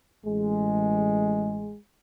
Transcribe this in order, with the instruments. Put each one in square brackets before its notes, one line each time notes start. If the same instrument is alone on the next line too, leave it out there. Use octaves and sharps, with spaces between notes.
[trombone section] A1 G#3